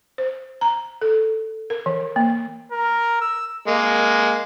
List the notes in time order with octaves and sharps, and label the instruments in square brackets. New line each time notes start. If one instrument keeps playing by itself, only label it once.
[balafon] C5
A#5
A4
A#4
E3
A#3
[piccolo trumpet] A#4
E6
[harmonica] G#3 A#3